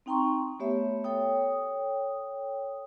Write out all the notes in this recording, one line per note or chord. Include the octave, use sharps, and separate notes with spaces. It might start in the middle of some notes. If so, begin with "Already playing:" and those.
C4 D#4 G5 A#5 C6 C#6
A3 B3 G4 C#5 E5
A4 C#5 G5 D#6